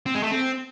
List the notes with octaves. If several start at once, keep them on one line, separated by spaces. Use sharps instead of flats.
C4
G#3
A3
C4